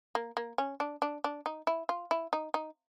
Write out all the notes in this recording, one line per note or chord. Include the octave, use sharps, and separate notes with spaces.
A#3
A#3
C#4
D4
D4
D4
D#4
E4
F4
E4
D#4
D#4